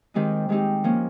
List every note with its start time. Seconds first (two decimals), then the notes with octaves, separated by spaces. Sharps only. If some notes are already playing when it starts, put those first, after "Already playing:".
0.14 D#3 G#3 C4 D#4 G4
0.49 D#3 G#3 C4 D#4 G4
0.84 F3 A#3 C#4